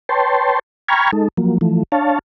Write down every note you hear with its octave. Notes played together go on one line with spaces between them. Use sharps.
B4 C#5 G5 A5 C6
G5 A#5 B5 C#6 F6 G#6
G#3 D#4 A4
F3 F#3 A#3
E3 F3 A3
D4 C#5 F5 A5